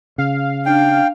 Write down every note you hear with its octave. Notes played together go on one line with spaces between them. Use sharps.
C#3 F5
D4 G5